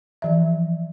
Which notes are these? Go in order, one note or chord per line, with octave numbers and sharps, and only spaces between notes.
E3 F3 E5